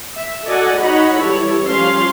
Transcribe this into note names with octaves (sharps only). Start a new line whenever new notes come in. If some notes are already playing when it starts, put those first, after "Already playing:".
E5
F#4 A4 D5 D#5 F#5 G#5
D#4 F#4 C#5 D#5 F#5 B5
E3 G3 E4 A4 C#5
F3 G3 C#4 F5 C6